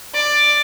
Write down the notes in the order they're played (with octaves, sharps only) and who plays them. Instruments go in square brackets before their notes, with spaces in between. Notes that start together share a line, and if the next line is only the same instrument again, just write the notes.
[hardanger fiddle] D5